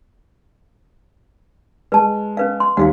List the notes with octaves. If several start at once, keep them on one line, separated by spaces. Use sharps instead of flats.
G#3 B4 A5
C#4 B4 F5
C6
D#2 F#4 F5 F#5